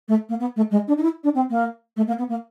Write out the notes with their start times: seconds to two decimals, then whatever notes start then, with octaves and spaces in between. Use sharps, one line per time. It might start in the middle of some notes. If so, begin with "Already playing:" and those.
0.08 A3
0.29 A#3
0.40 B3
0.56 A3
0.71 G#3
0.87 D4
0.97 D#4
1.03 E4
1.23 D4
1.34 C4
1.50 A#3
1.96 A3
2.07 A#3
2.18 B3
2.29 A#3